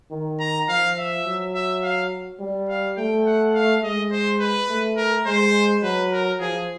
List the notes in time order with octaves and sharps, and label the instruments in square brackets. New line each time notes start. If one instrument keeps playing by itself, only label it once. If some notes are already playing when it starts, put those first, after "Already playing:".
[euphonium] D#3
[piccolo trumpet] A#5
[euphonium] F3 [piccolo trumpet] F5
[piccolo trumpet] E5
[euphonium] F#3
[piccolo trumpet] E5
F5
[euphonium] G3
[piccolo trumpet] F5
[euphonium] A3 [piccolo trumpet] G5
[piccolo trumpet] F#5
F5
[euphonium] G#3 [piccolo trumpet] D#5
[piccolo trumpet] C5
B4
[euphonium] A3
[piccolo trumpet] A#4
[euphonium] G#3 [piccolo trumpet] C5
[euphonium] F#3 [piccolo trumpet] B4
[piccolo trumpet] A#4
[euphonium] F3 [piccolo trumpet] G#4